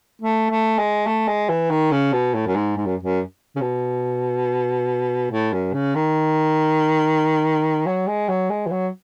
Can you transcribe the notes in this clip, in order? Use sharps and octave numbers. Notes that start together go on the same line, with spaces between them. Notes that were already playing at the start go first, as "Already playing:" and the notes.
A3
A3
G#3
A3
G#3
E3
D#3
C#3
B2
A2
F#2
G#2
G#2
F#2
F#2
C#3
B2
A2
F#2
C#3
D#3
F#3
G#3
F#3
G#3
E3
F#3